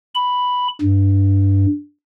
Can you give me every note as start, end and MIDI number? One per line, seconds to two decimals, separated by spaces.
0.15 0.68 83
0.82 1.66 43